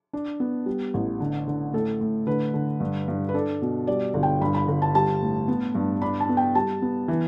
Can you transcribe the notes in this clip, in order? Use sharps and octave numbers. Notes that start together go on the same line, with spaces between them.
D4
B3
G3
A1
D3
D3
A2 A4
A2
D3 B4
D3
G2
G2
B4
D4 A4
B2
G3 D5
G1
G5
G2 B5
B5
G1
A5
G3 A5
A2
B3
G2
D4 B5
A5
B3
G5
G3 A5
B3
E3